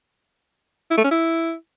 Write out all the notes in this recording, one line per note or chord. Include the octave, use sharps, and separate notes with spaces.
E4
A3
C#4
E4